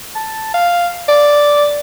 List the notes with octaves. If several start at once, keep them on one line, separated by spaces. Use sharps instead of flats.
A5
F5
D5